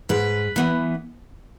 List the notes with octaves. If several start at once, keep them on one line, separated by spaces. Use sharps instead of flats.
G#2 B4
E3 B3